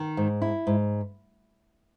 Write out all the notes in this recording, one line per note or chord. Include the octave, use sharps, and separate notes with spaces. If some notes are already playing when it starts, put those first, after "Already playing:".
Already playing: D#3
G#2
E4
G#2